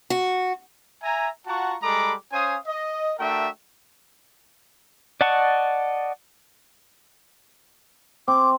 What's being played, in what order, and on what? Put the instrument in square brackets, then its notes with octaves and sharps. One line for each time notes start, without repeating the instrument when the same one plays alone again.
[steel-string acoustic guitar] F#4
[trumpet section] E5 G#5 A#5
F4 F#4 F#5 A5 A#5 C#6
G3 G#3 A4 A#5 B5 D6
C#4 C5 F5 G#5 D#6
D#5
A3 D4 F#4 A#4 E5 G5
[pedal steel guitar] D5 D#5 F#5 A5 C#6
[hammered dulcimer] C4 [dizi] D6